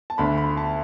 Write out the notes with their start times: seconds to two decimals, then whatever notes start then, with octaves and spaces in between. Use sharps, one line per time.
0.10 A5
0.18 D2 D3 B5
0.38 B5
0.57 A5